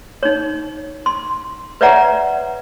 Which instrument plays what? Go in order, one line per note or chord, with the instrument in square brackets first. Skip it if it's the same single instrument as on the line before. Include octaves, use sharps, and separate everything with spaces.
[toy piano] D#4 C#5
C6
B4 C#5 D5 E5 F#5 A#5